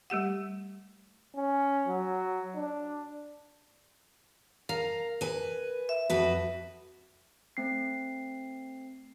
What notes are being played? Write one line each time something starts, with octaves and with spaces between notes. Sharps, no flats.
G3 A3 G4 F#5
C#4
F#3
D4
A#4 F5 A#5
B4 G#5
E5
F2 F#4 B4
A3 C4 C7